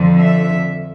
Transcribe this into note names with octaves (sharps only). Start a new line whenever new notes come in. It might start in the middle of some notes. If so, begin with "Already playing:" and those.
Already playing: F2 D3 F3
E5